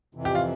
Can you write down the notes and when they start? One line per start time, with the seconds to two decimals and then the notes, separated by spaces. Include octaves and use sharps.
0.15 F2 C3 E3
0.25 G4
0.35 F4